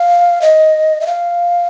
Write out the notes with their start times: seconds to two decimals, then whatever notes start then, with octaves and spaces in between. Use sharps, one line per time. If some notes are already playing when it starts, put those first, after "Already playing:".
Already playing: F5
0.42 D#5
1.01 E5
1.07 F5